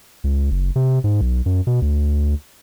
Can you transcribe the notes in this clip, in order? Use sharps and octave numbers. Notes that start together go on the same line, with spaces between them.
C#2
F#1
C3
G#2
B1
F#2
B2
D2